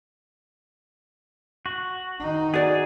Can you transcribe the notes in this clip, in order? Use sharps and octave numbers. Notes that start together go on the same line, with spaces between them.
F#4
D#3 D#4
F#4 G#4 D5